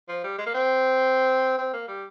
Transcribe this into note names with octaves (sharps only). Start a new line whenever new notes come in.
F3
G3
G#3
A#3
C4
C4
A#3
G3